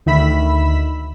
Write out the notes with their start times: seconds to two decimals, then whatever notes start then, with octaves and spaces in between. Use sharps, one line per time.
0.06 D2 D#3 E5 B5 E6 B6